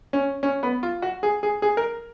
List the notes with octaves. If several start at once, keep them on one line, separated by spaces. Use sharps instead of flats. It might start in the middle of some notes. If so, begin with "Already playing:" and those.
C#4
C#4
B3
F4
F#4
G#4
G#4
G#4
A#4